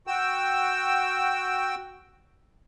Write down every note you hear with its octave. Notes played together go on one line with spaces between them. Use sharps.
F#4 G5 E6